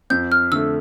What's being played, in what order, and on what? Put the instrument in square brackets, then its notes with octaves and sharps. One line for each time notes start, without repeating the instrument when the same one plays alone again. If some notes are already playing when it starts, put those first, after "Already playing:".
[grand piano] F2 [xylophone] G6
[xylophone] F6
[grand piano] D3 A3 [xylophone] E6